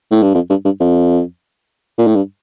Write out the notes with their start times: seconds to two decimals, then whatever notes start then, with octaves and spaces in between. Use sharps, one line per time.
0.11 A2
0.22 G2
0.35 F2
0.50 G2
0.65 G2
0.80 F2
1.98 A#2
2.07 A2
2.16 G2